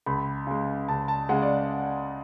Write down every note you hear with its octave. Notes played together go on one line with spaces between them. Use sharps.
C#2 B5
C#3 G#3
C#2 A5
A5
C#3 G#3 F#5
D5